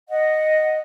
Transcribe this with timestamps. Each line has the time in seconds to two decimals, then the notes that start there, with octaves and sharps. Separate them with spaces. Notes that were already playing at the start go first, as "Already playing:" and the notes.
0.09 D#5 F#5